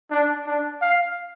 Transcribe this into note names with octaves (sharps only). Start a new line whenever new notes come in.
D4
D4
F5